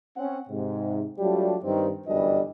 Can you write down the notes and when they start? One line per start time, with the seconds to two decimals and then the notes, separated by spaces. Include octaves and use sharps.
0.17 C4 C#4 F#5
0.49 G#2 C3
1.19 F#3 G3 A3 D4 F4 G4
1.62 G2 D#3 C4
2.06 G1 F#2 E3 G3 D4 D#5